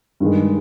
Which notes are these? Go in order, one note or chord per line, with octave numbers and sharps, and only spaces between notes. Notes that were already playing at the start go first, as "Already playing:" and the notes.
G2 D#3 G#3